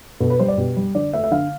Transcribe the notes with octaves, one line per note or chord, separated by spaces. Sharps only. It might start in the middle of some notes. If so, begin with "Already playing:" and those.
B2 A4
B4
G3 C5
D5
B2 G4
G3
D3 D5
A3 E5
E5
D3 F5